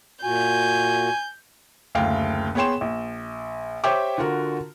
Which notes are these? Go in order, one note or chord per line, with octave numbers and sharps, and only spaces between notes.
A#2 F#4 G#5 G6
F#1 D2 F5 G5
B3 G#4 C#5 G5 C6 E7
A#1
G4 C5 C#5 E5 G5 D6
D3 F4 F#4 A#4